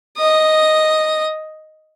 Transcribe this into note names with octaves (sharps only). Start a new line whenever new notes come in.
D#5 D#6